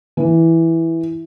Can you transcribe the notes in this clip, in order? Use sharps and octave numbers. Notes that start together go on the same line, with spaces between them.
E3